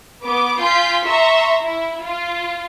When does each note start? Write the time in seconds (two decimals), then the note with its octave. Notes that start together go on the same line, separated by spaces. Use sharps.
0.22 B3 D6
0.59 F4 G#5 C6 G6 B6
1.04 E5 A#5 C6 C#6
1.61 E4
2.03 F4